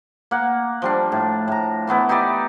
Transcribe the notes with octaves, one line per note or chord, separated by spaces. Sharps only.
A#3 F#5
F3 G3 D4
A2
A2 A#5
E3 A3 B3 E4
D#4 E4 G4 D5